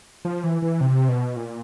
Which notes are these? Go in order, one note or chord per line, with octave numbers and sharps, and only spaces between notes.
F3
E3
E3
C3
B2
A#2